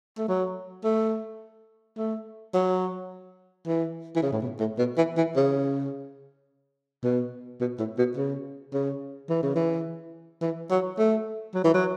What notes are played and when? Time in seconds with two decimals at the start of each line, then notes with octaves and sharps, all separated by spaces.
0.18 A3
0.28 F#3
0.84 A3
1.97 A3
2.54 F#3
3.67 E3
4.16 E3
4.22 C#3
4.32 A2
4.42 B2
4.60 A2
4.79 B2
4.97 E3
5.17 E3
5.36 C#3
7.04 B2
7.60 B2
7.79 A2
7.98 B2
8.17 C#3
8.73 C#3
9.30 E3
9.43 C#3
9.56 E3
10.42 E3
10.71 F#3
10.98 A3
11.55 F#3
11.64 E3
11.74 F#3